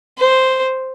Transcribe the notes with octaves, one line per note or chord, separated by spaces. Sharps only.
C5